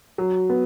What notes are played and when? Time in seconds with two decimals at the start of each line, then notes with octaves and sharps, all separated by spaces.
0.18 F#3
0.50 B3